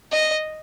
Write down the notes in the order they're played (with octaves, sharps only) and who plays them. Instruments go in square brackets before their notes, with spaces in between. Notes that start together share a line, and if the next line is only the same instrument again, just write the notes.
[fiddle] D#5